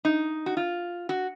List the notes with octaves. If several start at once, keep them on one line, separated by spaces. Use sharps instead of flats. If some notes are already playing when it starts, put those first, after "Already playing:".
D#4
F#4
F4
F#4